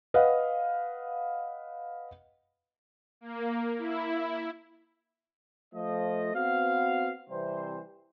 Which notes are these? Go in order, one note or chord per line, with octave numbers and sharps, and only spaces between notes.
B4 D#5 F5 F#5
A#3
E4
F3 A3 D#5
B3 C4 F#4 F5
C3 E3 G3 C5